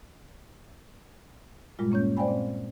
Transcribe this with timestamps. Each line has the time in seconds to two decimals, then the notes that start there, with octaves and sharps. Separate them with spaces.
1.79 G2 A#2 G3 G#3 F4
1.91 A#2 A#3 C#4 C#5 G6
2.17 C5 D5 F5 G5 G#5 B5
2.28 A#2 C4